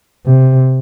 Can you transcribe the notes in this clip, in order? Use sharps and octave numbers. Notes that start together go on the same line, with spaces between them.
C3